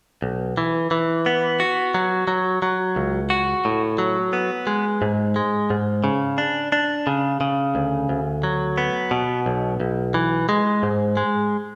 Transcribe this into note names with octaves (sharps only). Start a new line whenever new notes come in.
B1
E3
E3
B3
F#4
F#3
F#3
F#3
C#2
F#4
A2
F#3
B3
G#3
G#2
G#3
G#2
C#3
D4
D4
C#3
C#3
D2
D2
F#3
B3
B2
B1
B1
E3
G#3
G#2
G#3